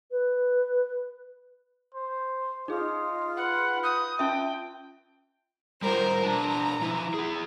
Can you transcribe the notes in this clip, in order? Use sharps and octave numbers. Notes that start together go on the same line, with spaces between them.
B4
C5
D#4 F4 G#4 D#5
B4 F#5
D#6 G6
C#4 F4 E5 G5 A5
G3 F4 A#4 C5
B2 D4 A5 A#5
F3 E4
E4 G#4